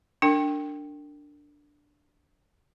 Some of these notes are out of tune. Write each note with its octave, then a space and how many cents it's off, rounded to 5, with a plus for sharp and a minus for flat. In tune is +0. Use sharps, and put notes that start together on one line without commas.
D4 +0 A#4 -35 G5 +0